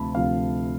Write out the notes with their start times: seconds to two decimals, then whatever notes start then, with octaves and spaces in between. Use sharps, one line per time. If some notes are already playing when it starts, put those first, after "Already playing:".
Already playing: D2 C3 F3 A5 B5
0.15 D2 C3 F3 F5